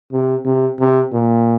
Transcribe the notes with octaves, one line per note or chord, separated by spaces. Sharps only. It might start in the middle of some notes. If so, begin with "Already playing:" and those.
C3
C3
C3
A#2